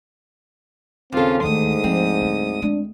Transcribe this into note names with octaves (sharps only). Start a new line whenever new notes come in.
D#2 C#3 C4 F4 A4
D2 G#2 D#3 A3 D#6
F3 C4
D3 F#3
G#3 D4